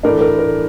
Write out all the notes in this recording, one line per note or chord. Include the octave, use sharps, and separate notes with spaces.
A2 E3 A3 D4 A#4
A#4
A#4